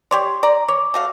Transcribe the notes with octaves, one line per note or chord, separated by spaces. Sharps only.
G4 C#5 D5 C6
D5 A#5
C#5 D6
A3 F#4 F5